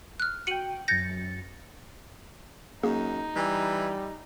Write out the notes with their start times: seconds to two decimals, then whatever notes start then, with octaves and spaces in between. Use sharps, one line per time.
0.20 F6 F#6
0.47 F#4 G5 C#7 D#7 F#7
0.88 F#2 G6 A6 A#6 C#7
2.83 F#2 A#3 D#4 G#4
3.36 E3 G3